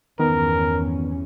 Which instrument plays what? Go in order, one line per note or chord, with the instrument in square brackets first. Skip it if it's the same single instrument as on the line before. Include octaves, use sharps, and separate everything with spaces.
[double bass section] E2 G2 C#4 [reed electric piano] D#3 B3 [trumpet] A#4